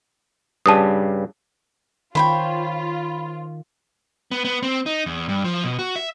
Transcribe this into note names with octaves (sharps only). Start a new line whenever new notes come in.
G2 C#3 G3 A5 D#6
D#3 F4 C5 C#5 G5 B5
B3
B3
C4
D#4
E2
G2
F3
B2
F#4
E5